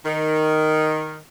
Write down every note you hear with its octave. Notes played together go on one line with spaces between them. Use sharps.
D#3